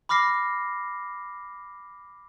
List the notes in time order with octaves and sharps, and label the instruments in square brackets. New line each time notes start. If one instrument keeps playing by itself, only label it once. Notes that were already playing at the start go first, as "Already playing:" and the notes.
[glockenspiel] B5 D6 F6 A#6 C7